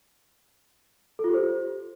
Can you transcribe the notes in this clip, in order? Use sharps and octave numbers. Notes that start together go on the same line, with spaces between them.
A4
F4
G4
C5